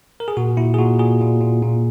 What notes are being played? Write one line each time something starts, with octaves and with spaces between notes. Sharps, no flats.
A#4
G#4
A#2 F#4
A#2 E4
G#4
A#2 F#4
A#2 G#4
A#2
A#2
A#2